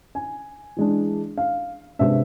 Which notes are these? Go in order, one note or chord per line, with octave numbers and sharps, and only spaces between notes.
G#5
E3 G#3 D4
F5
C3 G#3 B3 D4 E5